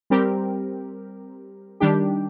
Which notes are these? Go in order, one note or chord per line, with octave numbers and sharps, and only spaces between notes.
G3 C4 G4 A#4
D#3 G3 D4 G4